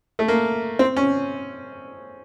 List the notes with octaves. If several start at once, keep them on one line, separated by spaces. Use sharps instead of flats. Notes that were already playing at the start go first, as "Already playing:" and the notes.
A3
A#3
C4
C#4